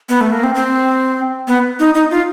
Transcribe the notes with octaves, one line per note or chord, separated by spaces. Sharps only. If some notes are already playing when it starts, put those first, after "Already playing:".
B3
A3
A#3
C4
C4
B3
D#4
D#4
F4